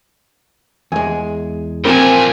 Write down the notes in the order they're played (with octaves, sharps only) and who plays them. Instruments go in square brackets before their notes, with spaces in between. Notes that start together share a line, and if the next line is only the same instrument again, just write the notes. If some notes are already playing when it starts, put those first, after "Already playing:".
[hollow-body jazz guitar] E2 G#3 [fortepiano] G#5
[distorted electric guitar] A#2 F3 [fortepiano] C4 [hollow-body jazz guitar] F4 A#4 B5 [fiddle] G#5